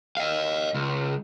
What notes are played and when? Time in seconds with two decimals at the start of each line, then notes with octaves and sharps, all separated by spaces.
0.17 D#5 F5
0.74 C#2